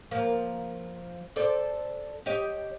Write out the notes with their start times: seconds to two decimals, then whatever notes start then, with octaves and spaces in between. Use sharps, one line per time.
0.11 F3 A#3
1.36 A4 C5 D5
2.26 G4 C#5 D#5